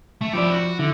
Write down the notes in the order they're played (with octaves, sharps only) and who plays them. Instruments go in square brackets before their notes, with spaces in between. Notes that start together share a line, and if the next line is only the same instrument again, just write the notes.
[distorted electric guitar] A3
[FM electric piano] F3 D5 [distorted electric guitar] E4 G4
[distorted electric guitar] F#4
[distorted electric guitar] D3 [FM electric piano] E4